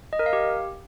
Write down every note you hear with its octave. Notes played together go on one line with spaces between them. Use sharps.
D#5
A#4
F5
G4